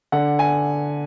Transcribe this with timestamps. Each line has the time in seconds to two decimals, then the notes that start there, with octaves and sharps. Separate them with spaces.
0.12 D3 F#5
0.39 G#5